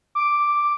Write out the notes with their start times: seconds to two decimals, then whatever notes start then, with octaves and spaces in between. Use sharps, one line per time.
0.15 D6